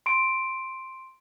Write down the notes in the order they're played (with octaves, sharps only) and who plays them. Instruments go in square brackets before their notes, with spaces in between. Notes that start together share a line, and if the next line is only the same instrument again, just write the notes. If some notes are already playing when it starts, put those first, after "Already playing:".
[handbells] C6 D7